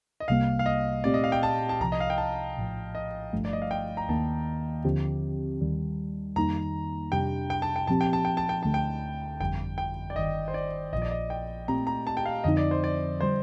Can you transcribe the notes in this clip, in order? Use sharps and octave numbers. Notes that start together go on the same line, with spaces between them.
D#5
C2 C3 G3 A#3 F5
F5
D#5
A#2 A3 C4 G4 D5
D#5
F5
G5
A5
A5
C2 C3 F3 A#5
D#5
F5
G5
A5
A#1 A2 F3
D#5
G1 G2 F3 A3
D5
D#5
F5
G5
A#5
D#2 D#3 A#3 A5
D#2 D3 F3 C4 G4
D#2 D#3 G3
F2 D#3 G3 A#3 D#4 A#5
F2 C3 G3 D4 G4 G5
G5
A5
G5
A#2 F3 C4 G4 A5
G5
A5
G5
A5
G5
D2 D3 A3 A5
G5
G1 F2 D3 G3 G5
G5
D5
G1 G2 D#3 D#5
C5
D5
A#1 A#2 F3 D#5
D5
D#5
G5
A#2 A3 C4 G4 A#5
A#5
A5
G5
F5
F2 D3 F3 C4 D#4 D#5
D5
C5
D5
D3 G3 C5